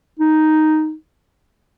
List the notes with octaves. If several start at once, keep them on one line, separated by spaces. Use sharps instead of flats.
D#4